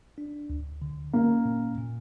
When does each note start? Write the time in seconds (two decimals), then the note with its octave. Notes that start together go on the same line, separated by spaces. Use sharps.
0.18 D4
0.50 D2
0.82 D3
1.13 A#3 C#4
1.45 A#2
1.78 A#2